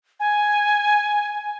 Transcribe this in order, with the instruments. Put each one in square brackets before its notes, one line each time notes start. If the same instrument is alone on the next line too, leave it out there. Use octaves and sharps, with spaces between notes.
[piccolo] G#5